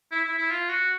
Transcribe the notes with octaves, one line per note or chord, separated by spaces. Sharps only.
E4
E4
E4
F4
F#4